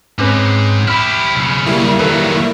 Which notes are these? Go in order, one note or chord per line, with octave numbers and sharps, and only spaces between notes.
G#2 C4 C#4 B4
E4 G4 B5 F6
B1 C#3
G3 A#3 E4
D#3 F#3 A4 B4